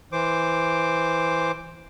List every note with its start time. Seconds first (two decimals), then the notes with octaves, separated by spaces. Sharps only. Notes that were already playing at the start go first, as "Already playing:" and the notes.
0.12 E3 C5 D6